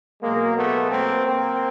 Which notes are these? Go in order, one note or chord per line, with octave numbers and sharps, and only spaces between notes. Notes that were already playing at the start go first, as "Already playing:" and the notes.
B2 F#3 G#3 A#3
A3 B3
A#3 C4
A#3 C4